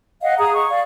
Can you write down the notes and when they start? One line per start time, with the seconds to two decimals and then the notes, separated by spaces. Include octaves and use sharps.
0.22 D#5 F5 F#5
0.38 G#4 A#5 D#6
0.52 C#6
0.69 D5 F5